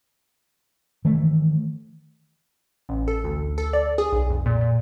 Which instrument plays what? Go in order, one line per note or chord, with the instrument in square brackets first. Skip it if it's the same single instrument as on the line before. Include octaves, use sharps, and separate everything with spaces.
[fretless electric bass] D#3 E3 A3
[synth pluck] A1
A4
D2
A4
D5
G#4
B1
F2
A#2
A#2